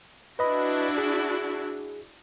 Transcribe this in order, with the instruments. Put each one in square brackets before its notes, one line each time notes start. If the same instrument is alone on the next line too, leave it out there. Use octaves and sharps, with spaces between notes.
[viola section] D4 E4 F#4 [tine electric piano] B4 D#5 B5
[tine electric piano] G#4